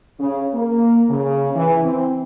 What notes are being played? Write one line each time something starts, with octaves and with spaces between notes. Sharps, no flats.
C#3
A#3
C#3
E3
C4